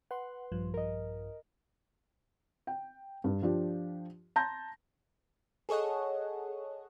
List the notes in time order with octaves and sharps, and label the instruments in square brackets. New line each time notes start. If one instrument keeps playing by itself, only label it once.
[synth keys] B4 C6 [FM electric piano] F#5
[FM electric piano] A#1 G2 F3
[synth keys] A#4 D#5
[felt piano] G5
G2
F3 D4 F4 G4
A5 A#5 C6 G6 A#6
[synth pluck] G#4 A4 C#5 D#5 F#5